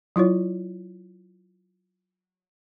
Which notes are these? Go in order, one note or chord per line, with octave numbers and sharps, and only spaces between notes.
F#3 E4 F4 C#5